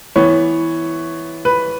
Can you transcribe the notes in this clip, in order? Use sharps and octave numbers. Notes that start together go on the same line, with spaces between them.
E3 B3 C#5
B4